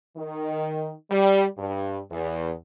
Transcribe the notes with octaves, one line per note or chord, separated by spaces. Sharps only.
D#3
G3
G2
E2